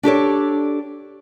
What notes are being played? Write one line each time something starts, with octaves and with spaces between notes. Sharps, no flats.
D4 G4 A4 C#5